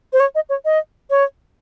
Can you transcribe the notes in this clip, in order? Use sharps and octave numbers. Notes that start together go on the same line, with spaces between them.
C5
C#5
D#5
C#5
D#5
C#5